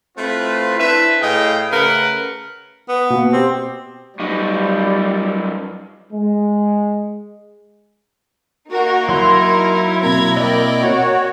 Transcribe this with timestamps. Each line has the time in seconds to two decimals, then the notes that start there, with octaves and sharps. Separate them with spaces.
0.17 A3 C4 E4 F4 B4
0.77 D4 E4 B4 C5 E5
1.21 A2 G#4 D#5 F5 G5
1.71 C#3 A3 A#4 B4 F#5
2.89 B3
3.10 B2 A#3
3.33 C4 G4
4.20 F#2 G3 D#4
6.13 G#3
8.71 A#3 D#4 F#4 A#4
9.09 F#3 E4 C6
10.03 B2 A#3 C4 A#5 G#6
10.37 A#4 D5 D#5 G5
10.82 F#4 C#5